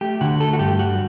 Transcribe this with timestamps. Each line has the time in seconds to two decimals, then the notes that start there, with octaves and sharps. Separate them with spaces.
0.01 A3 G4
0.21 D3 F#4
0.40 A3 A4
0.53 F#4
0.59 G2 G4
0.79 G3 F#4